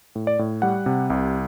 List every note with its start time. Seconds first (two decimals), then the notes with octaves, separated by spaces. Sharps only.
0.15 A2
0.27 D5
0.39 A2
0.62 G3 F#5
0.86 C3
1.10 C2